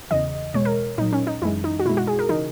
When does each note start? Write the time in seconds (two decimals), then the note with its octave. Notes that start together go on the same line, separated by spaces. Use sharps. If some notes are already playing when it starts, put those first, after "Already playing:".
0.11 E2 C#3 E3 D#5
0.54 B2 G#3 C#5
0.65 A#4
0.98 A#2 F#3 D#4
1.12 C#4
1.27 D#4
1.42 F#2 E3 G#3 E4
1.64 D#4
1.79 F#4
1.85 B2 G#3 E4
1.97 F#4
2.07 G#4
2.19 A#4
2.29 C#3 E3 D#4